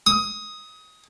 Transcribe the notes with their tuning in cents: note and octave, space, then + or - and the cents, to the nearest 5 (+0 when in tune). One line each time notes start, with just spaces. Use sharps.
D#6 +20